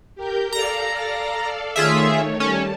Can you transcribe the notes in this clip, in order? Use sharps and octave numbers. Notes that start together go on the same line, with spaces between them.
G4 A#4 G6
A4 D5 F5 A#5
D#3 A3 F4 G#4 C#5 E5
G3 C#4 A5